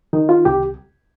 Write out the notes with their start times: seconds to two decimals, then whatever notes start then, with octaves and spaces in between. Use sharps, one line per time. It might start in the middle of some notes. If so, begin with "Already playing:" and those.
0.13 D#3 D#4
0.29 F4
0.45 C2 G4